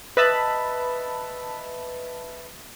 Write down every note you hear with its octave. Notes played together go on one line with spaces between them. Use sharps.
B4 D#5 E5 A5 B5